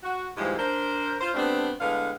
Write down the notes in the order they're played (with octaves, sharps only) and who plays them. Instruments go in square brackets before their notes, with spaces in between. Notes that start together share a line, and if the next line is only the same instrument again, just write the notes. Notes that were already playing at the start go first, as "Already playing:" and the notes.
[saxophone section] F#4
D#2 G#2 E3 F3 G3 G#3
D4 A#4 C5
F4 C5
G3 A3 B3 C4 D4
A2 D3 G#3 B3 F5